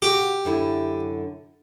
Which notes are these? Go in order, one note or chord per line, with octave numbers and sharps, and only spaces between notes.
F#4 G4
F#2 D3 E4